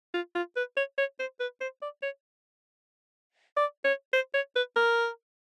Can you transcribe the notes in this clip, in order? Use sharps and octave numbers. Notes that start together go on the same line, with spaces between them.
F4
F4
B4
C#5
C#5
C5
B4
C5
D5
C#5
D5
C#5
C5
C#5
B4
A#4